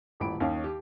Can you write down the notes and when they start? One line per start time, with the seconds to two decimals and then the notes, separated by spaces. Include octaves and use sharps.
0.20 D#1 A1 B5 D7
0.40 D#2 C#4 D#4 F5
0.64 G4